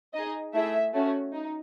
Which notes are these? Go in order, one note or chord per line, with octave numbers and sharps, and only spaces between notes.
D#4 G#4 D#5
A3 E4 G#4 E5
A3 C#4 F#4
D#4